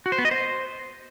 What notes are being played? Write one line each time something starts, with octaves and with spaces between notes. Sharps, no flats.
F#4
C5
B3
D#5
C5